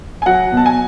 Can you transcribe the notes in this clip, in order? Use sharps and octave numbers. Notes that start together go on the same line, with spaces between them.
G#5
F#3 F#5
B2
A5
G#5